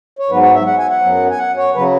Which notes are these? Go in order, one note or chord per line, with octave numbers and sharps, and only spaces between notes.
C#5
G#2 F#3 B3 B4
C#5
E5
F#5
G#5
F#5
F#2 F#3 B3
G#5
F#5
C#5
C#3 F#3 B4